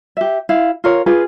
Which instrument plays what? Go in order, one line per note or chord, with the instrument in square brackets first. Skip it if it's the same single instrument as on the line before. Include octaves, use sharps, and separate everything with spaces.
[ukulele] G4 E5
E4 F5
F4 A#4 C#5
F4 G#4 B4